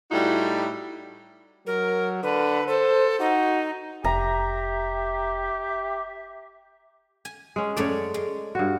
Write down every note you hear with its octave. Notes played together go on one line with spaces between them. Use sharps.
A2 G3 D#4 E4 F#4
F#3 A#4
D3 B4
A4 C5
D#4 F#4
F1 G4 E5 A#5
G#5
G#3 C#4
F#2 A3 C#5 D5 A5
G#3
G2 F#4